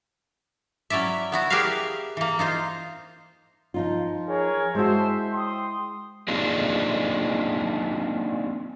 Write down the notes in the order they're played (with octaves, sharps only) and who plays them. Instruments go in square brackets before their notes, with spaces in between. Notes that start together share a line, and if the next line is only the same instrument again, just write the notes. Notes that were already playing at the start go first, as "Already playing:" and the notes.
[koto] F#3 C#4 E4 D5 E5
B3 E4 F#4
G4 G#4 A#4 B4 E5 F5
E3 A#3
D#4 F4 C5
[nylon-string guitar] F3 D#4 F4
[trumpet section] G#4 A#4 C#5
[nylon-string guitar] G#3 E4 F#4 [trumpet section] C5 E5 A5
[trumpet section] G5 C6 D#6
[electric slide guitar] A#3 C4 D4 D#4 F4 G#4